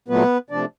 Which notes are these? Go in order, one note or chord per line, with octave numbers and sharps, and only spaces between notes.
A#2 F#3 A3 B3 B4
C3 F3 A3 D4 D5